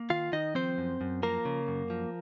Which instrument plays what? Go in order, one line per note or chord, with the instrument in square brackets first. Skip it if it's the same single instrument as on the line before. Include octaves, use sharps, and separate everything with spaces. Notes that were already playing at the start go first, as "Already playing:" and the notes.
Already playing: [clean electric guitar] A#3
D#3 F4 F5
D#3 D#4 D#5
F3 C4 C5
F#2
F#2
F3 A#3 A#4
C#3
F#2
F3